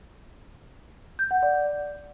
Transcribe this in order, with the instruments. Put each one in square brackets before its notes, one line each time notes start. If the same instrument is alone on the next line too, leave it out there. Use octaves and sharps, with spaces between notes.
[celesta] G6
F#5
D5